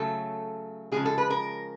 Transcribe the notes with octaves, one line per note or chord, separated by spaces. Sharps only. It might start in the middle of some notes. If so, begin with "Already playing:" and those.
Already playing: C#3 F#3 A3 A4
C#3 F3 G#3 G#4
A4
B4
A#4